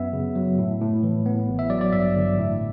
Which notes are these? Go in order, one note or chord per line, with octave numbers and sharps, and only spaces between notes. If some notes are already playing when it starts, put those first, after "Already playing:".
Already playing: F#2 B3 E5
C#3
F#3
A2
A2
E3
B3
A1
E5
F#3 D5
D5
G2 E5
D3
A2